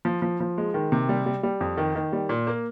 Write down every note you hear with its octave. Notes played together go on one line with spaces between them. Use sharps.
F3
F3
F3
G#3
D#3
C3
G3
G3
G3
F2
D#3
D#3
G3
A#2
A#3